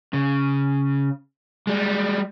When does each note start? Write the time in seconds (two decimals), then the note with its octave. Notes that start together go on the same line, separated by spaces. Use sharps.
0.13 C#3
1.67 G3 G#3